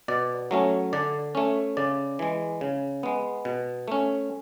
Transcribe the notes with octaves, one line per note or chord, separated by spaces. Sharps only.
B2 D5
F#3 A3 C#4
D3 D5
A3 C#4
C#3 D5
E3 G#3
C#3
G#3 B3
B2
A3 C#4